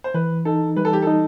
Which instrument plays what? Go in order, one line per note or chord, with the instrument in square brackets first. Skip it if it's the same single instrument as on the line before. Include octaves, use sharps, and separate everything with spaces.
[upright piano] C5
[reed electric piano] E3 [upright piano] B4
[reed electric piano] D#4 [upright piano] A4
[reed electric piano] G3 [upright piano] B4
[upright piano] A4
G4
[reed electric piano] D#4 [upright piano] A4